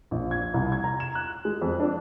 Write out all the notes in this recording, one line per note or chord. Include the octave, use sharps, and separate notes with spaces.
A#1
G#6
C2
G#6
A#5
E7
F#6
G#3
F2
D4